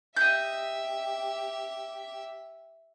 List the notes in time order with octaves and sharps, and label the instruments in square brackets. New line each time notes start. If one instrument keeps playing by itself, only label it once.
[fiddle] G4 E5 [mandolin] D#5 G6